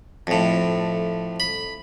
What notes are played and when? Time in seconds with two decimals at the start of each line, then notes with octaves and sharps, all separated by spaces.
0.27 F2 A2
1.40 B5